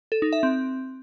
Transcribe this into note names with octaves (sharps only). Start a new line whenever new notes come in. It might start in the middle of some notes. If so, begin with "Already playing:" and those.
A4
D#4
E5
C4